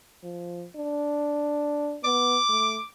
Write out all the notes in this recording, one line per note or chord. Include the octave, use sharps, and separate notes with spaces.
F3
D4
B3 D6
A3